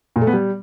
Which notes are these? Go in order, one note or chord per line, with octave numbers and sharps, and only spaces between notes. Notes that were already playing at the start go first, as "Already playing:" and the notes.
A#2
A3
B3
G3